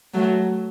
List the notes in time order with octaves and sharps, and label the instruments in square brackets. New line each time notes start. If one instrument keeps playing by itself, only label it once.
[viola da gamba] F#3 A3